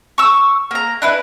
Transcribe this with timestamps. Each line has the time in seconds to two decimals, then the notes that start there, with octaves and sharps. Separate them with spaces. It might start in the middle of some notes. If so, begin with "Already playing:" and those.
0.18 C#6 E6
0.71 A#3 A#5
1.02 D4 E4 B4